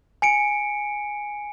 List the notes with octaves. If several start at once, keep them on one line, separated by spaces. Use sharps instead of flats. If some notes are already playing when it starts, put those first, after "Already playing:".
G#5 C#7 D7